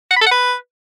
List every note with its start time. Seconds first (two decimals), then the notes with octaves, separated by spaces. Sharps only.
0.11 F#5
0.16 B5
0.21 A4
0.26 F#5
0.31 B4